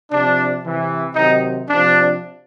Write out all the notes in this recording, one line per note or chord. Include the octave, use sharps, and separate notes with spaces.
C3 F3 D4
C3 E3
C3 D#3 F#3 D#4
C3 F3 D4